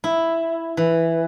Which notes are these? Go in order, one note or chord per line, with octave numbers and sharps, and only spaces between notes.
E4
E3